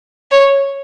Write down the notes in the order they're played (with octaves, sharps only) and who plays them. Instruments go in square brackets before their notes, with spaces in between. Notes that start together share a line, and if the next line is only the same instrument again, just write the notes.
[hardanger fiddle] C#5